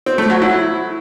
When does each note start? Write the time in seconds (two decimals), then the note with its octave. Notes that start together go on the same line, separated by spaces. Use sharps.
0.06 C4
0.18 A3
0.30 F#3
0.42 E4